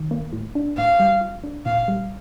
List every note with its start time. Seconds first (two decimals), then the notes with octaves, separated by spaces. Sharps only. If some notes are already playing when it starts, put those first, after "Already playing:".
Already playing: D#3
0.11 A#3
0.33 A2
0.55 D4
0.77 A2 F5
1.00 G3
1.21 F4
1.44 D4
1.66 A#2 F5
1.88 G3